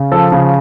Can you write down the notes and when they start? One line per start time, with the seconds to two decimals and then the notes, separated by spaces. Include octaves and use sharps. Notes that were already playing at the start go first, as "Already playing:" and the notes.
Already playing: C#3
0.12 F3 A4
0.32 C#3